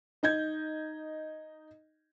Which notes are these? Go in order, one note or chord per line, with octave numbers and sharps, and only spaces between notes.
D#4 D#5 G6 G#6